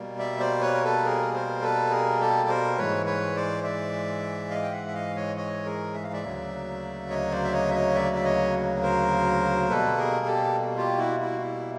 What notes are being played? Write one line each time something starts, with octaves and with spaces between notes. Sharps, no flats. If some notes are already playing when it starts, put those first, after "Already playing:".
Already playing: B2 G3 A#3
D5 E5
C5 D5
B4 C#5
A#4
A4 B4
G#4 A#4
A#4 C5
A4 B4
G#4 A#4
G4 A4
A#4 C5
G#2 E3 G#3 B4 C#5
B4 C#5
C5 D5
D5 E5
D#5 F5
G5
E5 F#5
E5
D#5 F5
C#5 D#5
C#5 D#5
G#4 A#4
E5
F5
D5 E5
D2 C#3 F#3 A#3
C#5 D#5
C5 D5
E5
C#5 D#5
E5
C#5 D#5
D5 E5
E5
C#5 D#5
A#4 C5
B2 G3 A#3 A4 B4
G#4 A#4
G4 A4
F4 G4
E4 F#4
E4 F#4
E4